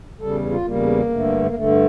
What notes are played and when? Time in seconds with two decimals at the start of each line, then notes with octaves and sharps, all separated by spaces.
0.21 E2 C#3 G3 A4
0.50 F4
0.65 E2 C#3 G3 A#3
1.11 G2 D3 A3
1.45 A#3
1.55 G2 D3 A3